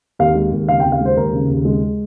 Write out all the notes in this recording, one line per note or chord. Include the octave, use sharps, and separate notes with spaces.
D#2 F5
G#3
D#2
C#3 F5
G5
D#2
F5
G#3 C5
D#2 A#4
C#3
D#2
G#3